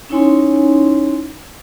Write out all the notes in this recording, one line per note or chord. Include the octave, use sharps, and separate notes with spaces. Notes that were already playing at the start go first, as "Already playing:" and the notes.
C#4 D#4 E4 C#5 G#5 C6